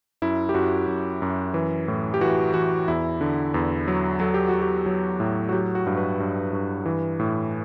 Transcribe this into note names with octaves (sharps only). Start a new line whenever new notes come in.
F#2 E4
G4
F#2 F#4
F#2
F#2
E3
A2
G4
E3 F#4
E3 F#4
E2 E4
D3
E2
F#3
F#3 A4
G4
F#4
F#3
G4
F#3
A2
F#4
F#3 G4
F#4
G2
B4
G2
G2
E3
A2